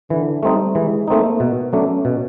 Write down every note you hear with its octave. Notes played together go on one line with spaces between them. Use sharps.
D3 E3
G3 A3 C4 D#4
E3 G#3
A3 A#3 C4 D#4
B2 B3
F#3 A3 C#4 D4
B2